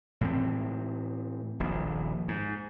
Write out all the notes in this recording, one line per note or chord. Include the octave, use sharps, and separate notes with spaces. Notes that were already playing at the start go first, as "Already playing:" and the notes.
A2 E3 C4
D#1 A#1
G#2